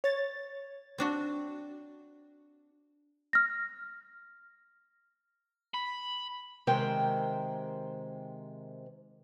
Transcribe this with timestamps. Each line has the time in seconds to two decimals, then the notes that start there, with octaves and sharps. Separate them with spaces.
0.04 C#5 A6
0.98 C4 D4 F#4
3.33 F6 A#6
5.74 B5
6.67 C3 D#3 G#3 A#4 C5 G5